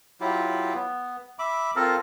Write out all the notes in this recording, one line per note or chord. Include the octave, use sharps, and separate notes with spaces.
F#3 E4 F4 G4
B3
E5 B5 D6
C4 F4 A4 A#4